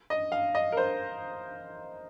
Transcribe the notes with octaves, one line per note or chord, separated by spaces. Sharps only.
D#5
F5
D#5
A#4
C5